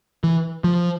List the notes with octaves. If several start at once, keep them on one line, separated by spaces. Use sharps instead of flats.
E3
F3